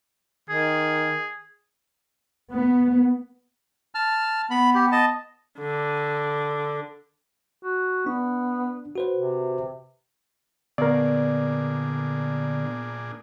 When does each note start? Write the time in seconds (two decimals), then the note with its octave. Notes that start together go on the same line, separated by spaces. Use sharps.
0.50 D#3 G#4
2.51 B3
3.95 A5 F6
4.51 B3 B5
4.75 G4
4.92 D#5 A5
5.59 D3
7.63 F#4
8.06 B3 D4
8.95 F#4 B4 C5
9.16 C3
10.78 A#2 D3 B3 D4 G#4 A#4 D5